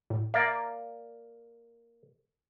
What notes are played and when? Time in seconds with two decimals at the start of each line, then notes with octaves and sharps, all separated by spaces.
0.10 A2
0.34 A#3 D5 E5